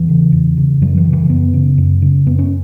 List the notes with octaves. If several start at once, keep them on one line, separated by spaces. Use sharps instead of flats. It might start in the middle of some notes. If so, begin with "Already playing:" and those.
Already playing: E2 E3
C#3
E2
C#3
F#2 F#3
E3
C#3
E3
F#2 B3
C#3
F#2
C#3
F#2 B3
C#4